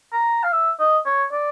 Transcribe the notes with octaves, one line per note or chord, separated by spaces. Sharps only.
A#5
F5
E5
D#5
C#5
D5